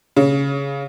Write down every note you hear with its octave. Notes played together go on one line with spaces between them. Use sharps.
C#3